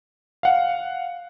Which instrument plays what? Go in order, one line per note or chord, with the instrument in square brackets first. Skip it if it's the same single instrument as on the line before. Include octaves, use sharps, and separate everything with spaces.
[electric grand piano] F5 F#5